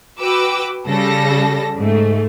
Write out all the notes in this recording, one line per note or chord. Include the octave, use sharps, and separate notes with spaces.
F#4 B4 G5 D6 E6
C#3 G3 A4 A#6
G#2 A3